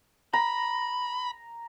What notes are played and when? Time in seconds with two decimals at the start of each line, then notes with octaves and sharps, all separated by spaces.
0.33 A#5 B5